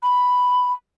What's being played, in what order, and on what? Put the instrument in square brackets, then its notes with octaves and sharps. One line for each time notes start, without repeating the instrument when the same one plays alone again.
[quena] B5